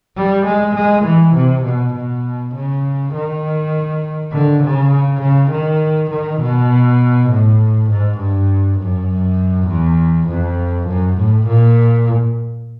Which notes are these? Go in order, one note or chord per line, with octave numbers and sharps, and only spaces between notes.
G3
G#3
G#3
E3
C3
B2
B2
C#3
D#3
D3
C#3
C#3
D#3
D#3
B2
A2
G#2
G2
F#2
E2
F2
F#2
A2
A#2